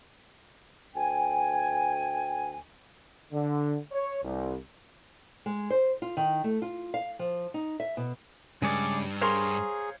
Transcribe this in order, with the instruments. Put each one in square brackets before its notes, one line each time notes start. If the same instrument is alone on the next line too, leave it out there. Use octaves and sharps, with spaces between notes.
[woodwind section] D2 G5 G#5
[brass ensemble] D3
C#5
C2
[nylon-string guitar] G#3
C5
F4
D#3
A3
F4
F5
F3
D#4
E5
B2
[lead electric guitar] G2 [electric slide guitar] C#3 G#3 C#5 [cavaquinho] G#4 D5
[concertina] G#4 [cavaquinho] A#4 C6 C#6 [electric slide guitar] C5 C#5 F5